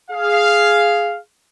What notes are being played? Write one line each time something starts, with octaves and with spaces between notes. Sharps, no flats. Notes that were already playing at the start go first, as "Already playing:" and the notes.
G#4 F5